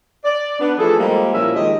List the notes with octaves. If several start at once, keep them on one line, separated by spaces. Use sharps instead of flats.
D5
B3 D4
E3 F3 A3 G#4 A4
F3 G3 G#3 A#3
A#2 F3 C#4 E4 A#4 E5
D#3 F3 G#3 G4 D#5